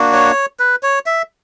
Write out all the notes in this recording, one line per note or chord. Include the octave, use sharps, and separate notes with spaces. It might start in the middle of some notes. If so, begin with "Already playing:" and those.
Already playing: A#3 D4 F#4
C#5
B4
C#5
E5